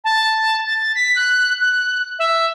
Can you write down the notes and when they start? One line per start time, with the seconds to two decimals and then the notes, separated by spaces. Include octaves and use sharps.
0.04 A5
0.66 A6
0.95 B6
1.16 F#6
1.61 F#6
2.19 E5